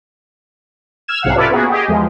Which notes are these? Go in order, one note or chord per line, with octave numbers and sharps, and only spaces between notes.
E6 F6 G#6 E7
B1 G#2 C3 F5 F#5
C#4 F4 A4 B4 D5 E5
A#3 B3 F#4 G#4
G4 G#4 D#5
E2 F3 G#3